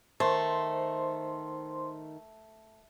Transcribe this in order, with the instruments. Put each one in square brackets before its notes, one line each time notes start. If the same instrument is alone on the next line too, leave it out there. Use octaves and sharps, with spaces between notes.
[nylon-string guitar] D#3 [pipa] A3 [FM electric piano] C5 C6